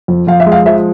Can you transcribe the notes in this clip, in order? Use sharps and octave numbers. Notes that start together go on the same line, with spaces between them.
F2
F2 F5
E5
G#3
F5
F3 E5